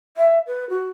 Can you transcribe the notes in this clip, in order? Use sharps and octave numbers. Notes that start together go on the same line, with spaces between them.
E5
B4
F#4